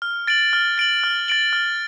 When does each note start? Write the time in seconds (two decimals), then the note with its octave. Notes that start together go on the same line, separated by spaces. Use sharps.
0.02 F6
0.27 A6 D7 F#7
0.53 F6
0.78 A6 D7 F#7
1.03 F6
1.28 A6 D7 F#7
1.53 F6